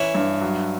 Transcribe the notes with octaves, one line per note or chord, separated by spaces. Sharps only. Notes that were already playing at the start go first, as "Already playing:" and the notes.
Already playing: E3 C#4 E4
G2
F#3